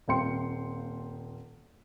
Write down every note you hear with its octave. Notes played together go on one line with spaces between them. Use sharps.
D#1 A#3 C4 G5 C6 C#7